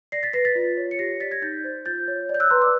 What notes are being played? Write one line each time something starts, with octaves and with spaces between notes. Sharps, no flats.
D5 A#6 C7
A6 B6
B4 A#6 C7
A6 B6
F4
C#5
C#7
G4 A#6 C7
D5 A6 B6
G#6 A#6
D#4 G6 A6
C5
F4 G6 A6
C#5
D5
G6
E6 F#6
B4 A#5 C6
D6 E6